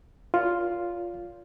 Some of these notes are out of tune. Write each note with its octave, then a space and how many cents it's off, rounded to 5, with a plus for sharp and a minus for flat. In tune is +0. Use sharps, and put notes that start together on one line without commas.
F4 +0 A#4 +10 D5 -45